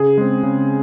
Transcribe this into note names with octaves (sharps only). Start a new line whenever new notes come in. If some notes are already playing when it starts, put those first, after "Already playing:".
Already playing: C#3 G#4
G#3 C4
C#3